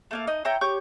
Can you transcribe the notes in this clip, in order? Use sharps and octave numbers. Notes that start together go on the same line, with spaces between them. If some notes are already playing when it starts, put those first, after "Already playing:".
A3 A#3 F5
D#4 D#5
E4 C#5 G5 A#5
G4 C#5 C#6 G6